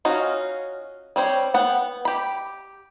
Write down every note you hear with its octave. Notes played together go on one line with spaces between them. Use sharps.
C#4 D#4 F4 F#4
G3 C4 C5 C#5
B3 F#5 G5
G4 B5